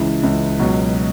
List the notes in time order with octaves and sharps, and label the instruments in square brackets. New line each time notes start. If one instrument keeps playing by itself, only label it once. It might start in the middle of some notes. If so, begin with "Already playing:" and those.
Already playing: [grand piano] C#2 C#3 E3
C#2 C#3 E3
C#2 B2 F#3